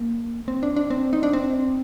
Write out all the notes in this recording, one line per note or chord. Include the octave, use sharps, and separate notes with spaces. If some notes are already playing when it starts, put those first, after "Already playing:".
Already playing: A#3
C4
D4
D4
C4
D#4
D4
C4